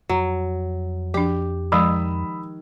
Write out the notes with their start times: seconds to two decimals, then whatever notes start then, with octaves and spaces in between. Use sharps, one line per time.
0.09 F2 F#3
1.14 F3 D4 G4
1.72 D#3 F3 G#3 B5 D#6 E6